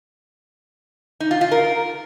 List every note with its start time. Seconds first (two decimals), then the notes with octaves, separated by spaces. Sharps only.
1.20 D#4
1.31 F4
1.41 F4
1.51 A#4